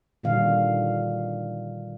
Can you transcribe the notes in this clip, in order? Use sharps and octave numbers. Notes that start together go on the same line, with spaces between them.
A#2 D3 D#3 G3 F#4 F5